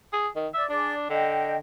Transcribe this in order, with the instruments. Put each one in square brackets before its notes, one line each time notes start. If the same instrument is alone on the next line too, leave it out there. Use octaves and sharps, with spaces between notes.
[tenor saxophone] G#4
D#3
[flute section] D5 [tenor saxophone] E5
[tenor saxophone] D4 [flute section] G#4 D5
[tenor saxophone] D3 [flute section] D#5 G5